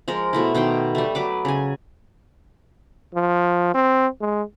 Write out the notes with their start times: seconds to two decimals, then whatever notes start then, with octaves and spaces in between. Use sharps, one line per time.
0.08 F3 G#3 A#4
0.33 B2 A3 E4
0.54 B2 D#3 G5 C6
0.95 G3 A3
1.15 F#3 B4 D6
1.45 C#3 G#5
3.14 F3
3.74 C4
4.21 G#3